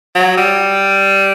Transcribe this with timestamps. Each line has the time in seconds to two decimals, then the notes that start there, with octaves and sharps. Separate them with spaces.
0.15 F#3
0.37 G3